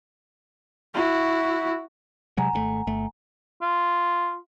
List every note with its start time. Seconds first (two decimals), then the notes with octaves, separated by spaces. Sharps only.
0.94 E4 F#4
2.37 C3 F#3 G#3 F#5 G#5 A#5
2.53 G#1 C3 A3
2.87 G1 A3
3.62 F4